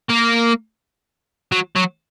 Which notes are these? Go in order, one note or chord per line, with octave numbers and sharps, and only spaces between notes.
A#3
F#3
F#3